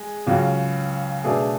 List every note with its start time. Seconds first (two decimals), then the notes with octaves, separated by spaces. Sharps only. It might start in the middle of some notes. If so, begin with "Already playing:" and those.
Already playing: G#3
0.27 C#2 C#3 F#3
1.24 B2 A3 D4 G#4